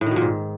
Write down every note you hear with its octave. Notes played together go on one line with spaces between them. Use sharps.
A2
D#3
B2
A#2
G#2